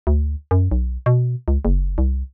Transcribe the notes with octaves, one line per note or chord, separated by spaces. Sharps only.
D2
F#2
B1
B2
C#2
F#1
C2